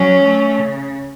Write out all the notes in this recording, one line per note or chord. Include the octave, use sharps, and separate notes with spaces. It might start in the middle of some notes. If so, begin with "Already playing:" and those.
Already playing: F#3 C#4
A3
C#3